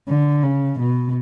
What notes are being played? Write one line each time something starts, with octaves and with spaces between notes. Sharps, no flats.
D3
C#3
B2